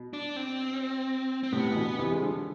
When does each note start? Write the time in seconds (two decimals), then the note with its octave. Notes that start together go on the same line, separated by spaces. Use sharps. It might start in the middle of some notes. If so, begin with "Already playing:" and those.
Already playing: B2
0.13 D4
0.36 C4
1.43 C4
1.52 A2 C3 B3
1.71 E3
1.75 B2 D3
1.99 C3 E3
2.12 G#3
2.22 D3 F3